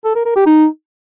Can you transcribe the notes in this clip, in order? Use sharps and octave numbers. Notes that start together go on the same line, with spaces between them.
A4
A#4
A#4
G4
D#4